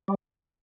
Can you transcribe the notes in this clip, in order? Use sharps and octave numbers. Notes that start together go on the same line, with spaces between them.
G3